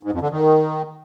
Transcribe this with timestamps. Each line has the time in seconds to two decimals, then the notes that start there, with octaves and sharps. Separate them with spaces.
0.03 G#2
0.12 F2
0.21 D3
0.30 D#3